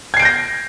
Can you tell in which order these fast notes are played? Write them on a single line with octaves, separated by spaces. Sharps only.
G#6 C7 D7 G6 A#6